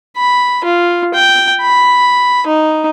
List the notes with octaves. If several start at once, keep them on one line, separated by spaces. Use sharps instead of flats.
B5
F4
G5
B5
D#4